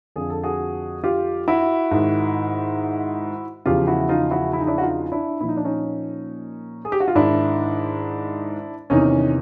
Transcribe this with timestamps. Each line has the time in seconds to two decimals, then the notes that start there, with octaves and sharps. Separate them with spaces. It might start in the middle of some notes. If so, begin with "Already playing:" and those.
0.16 F2 D3 F3 G#4
0.30 A4
0.43 F#4 G#4
1.04 F4 G4
1.48 E4 F#4
1.91 G#2 D#3
3.65 E2 C#3 F3 F4 G4
3.87 E4 F#4
4.09 D#4 F4
4.31 E4 F#4
4.53 E4
4.60 D#4
4.67 D4 E4
4.78 F#4
4.82 D#4 F4
5.12 D4 E4
5.41 A#2 F3 E4
5.49 D#4
5.57 D4
5.65 C#4 D#4
6.85 G#4
6.92 G4
7.00 F#4
7.08 F4
7.15 G#2 D#3 D4 E4
8.90 E2 C3 D#3 C#4 D#4